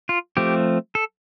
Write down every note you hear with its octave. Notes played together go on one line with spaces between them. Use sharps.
F4
F3 A3 C4 G4
A4